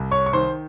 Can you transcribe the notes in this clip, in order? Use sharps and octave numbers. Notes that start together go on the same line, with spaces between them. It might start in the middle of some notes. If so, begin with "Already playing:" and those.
Already playing: C2
C#5 C#6
C#6
D#3 C5 C6